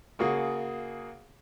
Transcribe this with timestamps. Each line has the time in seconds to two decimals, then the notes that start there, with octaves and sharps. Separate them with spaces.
0.19 C#3 A#3 F#4 G#4